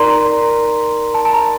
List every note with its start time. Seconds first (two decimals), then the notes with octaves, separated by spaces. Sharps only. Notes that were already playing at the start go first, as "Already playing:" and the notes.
Already playing: D#4 A#4 D5 A#5 C6
0.10 A#5
1.14 A5
1.25 A5
1.33 A#5